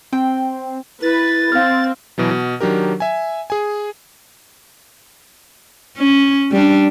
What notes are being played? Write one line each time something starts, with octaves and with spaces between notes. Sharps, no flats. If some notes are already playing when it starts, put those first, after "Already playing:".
C4 G5
E4 B4 A6
C4 F5 F6
B2 E3 F#3
B2
D#3 F#3 D4 G4 A#4
E5 G#5
G#4 G#5
C#4
G3 D4